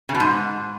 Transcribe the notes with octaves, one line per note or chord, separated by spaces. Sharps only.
C#3
B2
G#2